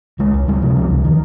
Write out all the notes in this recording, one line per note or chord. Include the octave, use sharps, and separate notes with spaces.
C#2 G#3
C#2
C#2 G3
C3 F3
C#2 F3
C#2
D#3